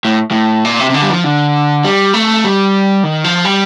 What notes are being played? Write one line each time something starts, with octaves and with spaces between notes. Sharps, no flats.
A2
A2
A#2
C3
C3
D3
G3
F3
D3
G3
A3
G3
D#3
F3
G3